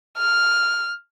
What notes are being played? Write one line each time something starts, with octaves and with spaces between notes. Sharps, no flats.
F6